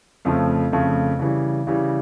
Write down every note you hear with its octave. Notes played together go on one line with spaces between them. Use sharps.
F2 C#3 F3 A3
F2 C#3 F3 A3
C#3 E3 G3
C#3 E3 G3